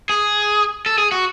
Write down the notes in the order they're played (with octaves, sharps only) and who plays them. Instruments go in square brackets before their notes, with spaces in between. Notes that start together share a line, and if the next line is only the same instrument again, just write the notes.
[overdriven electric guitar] G#4
A4
G#4
F#4